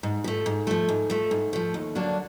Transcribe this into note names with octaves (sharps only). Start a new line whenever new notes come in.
G#2
F3 A3
G#2
F3 A3
G#2
F3 A3
G#2
F3 A3
D#2
D3 F#3 A#3 D4